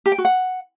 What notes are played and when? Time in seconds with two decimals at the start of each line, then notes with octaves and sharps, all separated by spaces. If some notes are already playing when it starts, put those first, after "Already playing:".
0.06 G4
0.12 G5
0.18 F#4
0.25 F#5